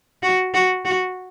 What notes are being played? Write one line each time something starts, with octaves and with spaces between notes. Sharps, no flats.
F#4
F#4
F#4